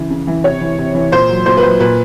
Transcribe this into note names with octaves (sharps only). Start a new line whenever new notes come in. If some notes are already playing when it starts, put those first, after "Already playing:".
Already playing: C#3 E3
C#3
E3
C3 C#5
E3
C3
E3
A#2 C5
F#3
A#2 C5
B4
F#3 C5
A#2 B4